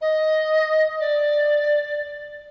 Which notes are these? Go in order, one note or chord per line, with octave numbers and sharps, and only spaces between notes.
D#5
D5